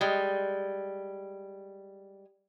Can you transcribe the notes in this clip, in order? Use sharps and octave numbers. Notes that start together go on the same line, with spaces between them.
G3 G#3